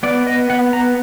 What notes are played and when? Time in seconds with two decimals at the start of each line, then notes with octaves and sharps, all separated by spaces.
0.03 B3 D5
0.27 D#5
0.50 B3 F#5
0.73 A#5